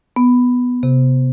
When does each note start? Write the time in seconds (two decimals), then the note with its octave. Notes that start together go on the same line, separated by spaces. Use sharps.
0.16 B3
0.83 C3